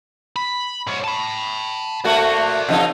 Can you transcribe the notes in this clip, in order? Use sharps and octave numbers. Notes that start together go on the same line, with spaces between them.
B5
G#2 C#4
A5 B5
A3 A#3 F#4 C5 D5
C3 F3 D#4